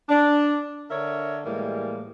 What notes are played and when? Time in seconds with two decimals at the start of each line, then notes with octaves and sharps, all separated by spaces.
0.09 D4
0.90 D3 A#4 C#5 D5 E5
1.45 A2 E3 G3 G#3 A#3